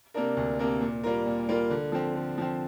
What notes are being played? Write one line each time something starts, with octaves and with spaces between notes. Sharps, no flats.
C3 A#3 D4 A#4
D2
C3 A#3 D4 A#4
A#2
G3 A#3 F4 A#4
A#2
G3 A#3 F4 A#4
D3
F3 C4
D3
F3 C4